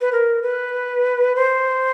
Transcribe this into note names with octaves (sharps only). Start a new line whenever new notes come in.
B4
A#4
B4
C5